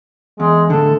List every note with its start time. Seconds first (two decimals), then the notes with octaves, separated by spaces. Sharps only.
0.40 E2 G#3
0.70 A2 D3 A4